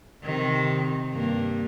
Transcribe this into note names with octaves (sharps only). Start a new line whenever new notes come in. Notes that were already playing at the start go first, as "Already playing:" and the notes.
C3 D#3
G2 A#3